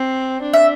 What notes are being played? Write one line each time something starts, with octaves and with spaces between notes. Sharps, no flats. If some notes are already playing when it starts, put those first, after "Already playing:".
Already playing: C4
D4
E5